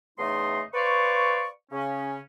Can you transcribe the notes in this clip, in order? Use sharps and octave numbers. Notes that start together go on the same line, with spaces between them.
E2 C#3 A3 D#4 D#5 C6
B4 C5 D5 F5 C#6
C#3 C#4